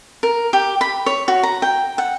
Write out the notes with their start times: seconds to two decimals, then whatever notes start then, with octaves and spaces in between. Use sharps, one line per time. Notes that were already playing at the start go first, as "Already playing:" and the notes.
0.23 A#4
0.53 G4
0.81 B5
1.06 C#5
1.28 F#4
1.43 A#5
1.62 G5
1.98 F#5